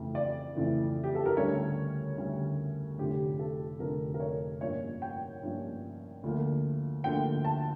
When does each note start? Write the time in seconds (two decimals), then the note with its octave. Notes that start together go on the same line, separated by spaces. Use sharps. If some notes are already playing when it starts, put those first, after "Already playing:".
Already playing: F2 C#3 E3 A3
0.15 D5
0.55 F2 C#3 E3 A3
1.04 G4
1.15 A4
1.26 A#4
1.37 D2 D3 G3 C#4 C#5
2.18 D2 D3 G3 C#4
2.98 F1 F2 D3 G4
3.39 A4
3.79 F1 F2 D3 A#4
4.14 A#4
4.20 C#5
4.61 G2 F3 A#3 C#4 C#5
5.02 G5
5.42 G2 F3 A#3 C#4
6.23 D2 D3 F3 A#3
7.04 D2 D3 F3 A#3 G5
7.44 A5